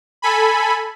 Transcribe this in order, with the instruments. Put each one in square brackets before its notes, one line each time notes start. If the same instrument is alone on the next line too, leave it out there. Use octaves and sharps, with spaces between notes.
[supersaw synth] A4 G#5 B5